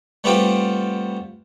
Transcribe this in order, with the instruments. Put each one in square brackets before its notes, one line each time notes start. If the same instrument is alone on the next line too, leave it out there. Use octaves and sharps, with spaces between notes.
[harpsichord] G3 A3 B3 C4 F4 G4